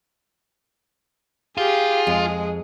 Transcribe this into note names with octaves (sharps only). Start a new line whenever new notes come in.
F4 G4 G#4
F2 G#3